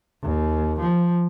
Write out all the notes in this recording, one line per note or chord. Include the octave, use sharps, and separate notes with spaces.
D#2
F3